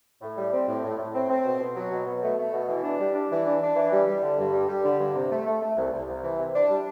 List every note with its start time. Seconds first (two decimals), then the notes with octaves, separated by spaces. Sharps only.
0.22 A2
0.37 G3
0.53 C4
0.67 A2
0.84 A2
0.99 A2
1.15 C4
1.30 C4
1.45 B2
1.61 B2
1.76 F#3
1.92 B2
2.06 B2
2.22 A3
2.38 A3
2.54 B2
2.68 E3
2.84 D4
2.99 G3
3.15 D4
3.31 E3
3.46 D4
3.62 D4
3.76 E3
3.92 G3
4.07 G3
4.22 D3
4.38 G2
4.53 G3
4.69 G3
4.84 D3
4.99 G2
5.15 C3
5.30 A3
5.46 A3
5.62 A3
5.77 C2
5.92 C2
6.08 C2
6.23 E3
6.39 C3
6.54 D4
6.69 G3